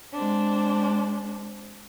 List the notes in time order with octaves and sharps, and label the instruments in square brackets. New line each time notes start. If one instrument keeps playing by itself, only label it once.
[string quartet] G#3 C4 D4